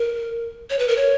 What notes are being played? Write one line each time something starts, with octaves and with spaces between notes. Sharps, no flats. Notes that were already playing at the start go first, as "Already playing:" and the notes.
Already playing: A#4
C#5
B4
A#4
C#5